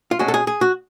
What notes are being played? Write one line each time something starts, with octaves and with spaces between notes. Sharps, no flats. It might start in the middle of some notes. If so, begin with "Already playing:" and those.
F4
B2 G#3 C#4 F#4
A4
G#4
G#4
F#4